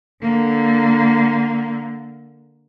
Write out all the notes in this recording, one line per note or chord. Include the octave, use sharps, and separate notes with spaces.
D3 A#3